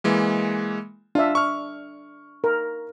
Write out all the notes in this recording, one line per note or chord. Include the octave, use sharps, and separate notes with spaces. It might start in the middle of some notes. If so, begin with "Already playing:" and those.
E3 G#3 A#3
D4 F4 E5
C#6 F6
A#4